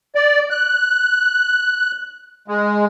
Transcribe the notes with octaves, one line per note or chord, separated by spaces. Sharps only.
D5
F#6
G#3